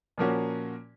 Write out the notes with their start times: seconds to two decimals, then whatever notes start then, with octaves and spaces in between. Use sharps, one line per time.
0.18 A#2 F3 A#3 C#4 F#4